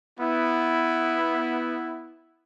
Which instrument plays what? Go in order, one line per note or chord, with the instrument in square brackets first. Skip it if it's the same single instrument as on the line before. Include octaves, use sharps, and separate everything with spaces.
[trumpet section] B3 E4